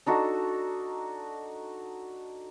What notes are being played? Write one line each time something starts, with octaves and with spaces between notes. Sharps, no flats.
D4 D#4 F#4 A4